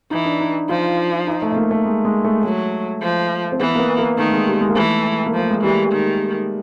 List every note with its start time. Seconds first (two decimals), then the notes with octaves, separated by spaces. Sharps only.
0.11 E3 D#4
0.25 D4
0.40 D#4
0.69 F3 F4
1.27 D#4
1.42 A3
1.52 A3
1.56 A#3
1.71 A3
1.85 G#3
2.05 G#3
2.24 A3
2.43 F#3 A3
3.01 F3
3.52 C4
3.59 E3 B3
3.75 A#3
3.79 B3
3.98 A#3
4.17 D#3 A3
4.32 G#3
4.47 G3
4.61 G#3
4.70 A#3
4.76 E3 A3
5.26 A#3
5.34 F3
5.39 A3
5.51 G#3
5.63 E3 G3
5.92 D#3